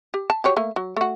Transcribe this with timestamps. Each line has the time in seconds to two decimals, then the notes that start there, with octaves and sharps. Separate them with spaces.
0.14 G4
0.30 A5
0.44 F#4 G4 C#5
0.56 A3 A#3
0.76 F#3
0.97 A3 F#4